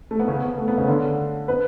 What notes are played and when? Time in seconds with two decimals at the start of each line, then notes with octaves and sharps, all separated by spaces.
0.11 A3
0.19 B3
0.28 C#3 C#4
0.43 B3
0.58 A3
0.68 B3
0.78 C#3 C#4
0.88 D3 D4
1.48 B3 B4